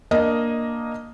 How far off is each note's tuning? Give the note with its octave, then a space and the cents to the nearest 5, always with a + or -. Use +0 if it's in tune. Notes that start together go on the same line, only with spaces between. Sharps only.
A#3 +5 D4 +0 D#5 +0